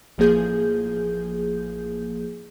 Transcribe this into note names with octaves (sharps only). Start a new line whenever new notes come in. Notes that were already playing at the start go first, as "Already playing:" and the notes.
A1 F3 A#3 G#4 G6